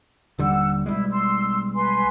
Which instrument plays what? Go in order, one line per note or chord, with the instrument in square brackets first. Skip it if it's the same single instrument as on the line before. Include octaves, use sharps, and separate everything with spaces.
[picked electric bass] D#1 D3 G3 [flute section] F#5 E6
[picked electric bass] B1 G3 G#3 [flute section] E4
[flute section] C6 E6
B4 G#5 C6